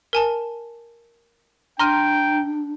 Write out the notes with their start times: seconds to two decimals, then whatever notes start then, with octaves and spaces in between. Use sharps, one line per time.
0.13 A#4 G#5 A5
1.79 D4 G5 A#5 C6 F6 D#7